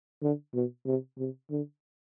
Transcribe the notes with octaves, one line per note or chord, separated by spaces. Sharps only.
D3
B2
C3
C3
D3